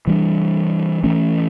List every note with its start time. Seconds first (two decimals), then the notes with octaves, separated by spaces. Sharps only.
0.07 E3 G3 D4
1.04 E3 A3 C#4